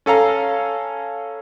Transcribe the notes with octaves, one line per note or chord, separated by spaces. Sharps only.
C#4 A4 F5 A#5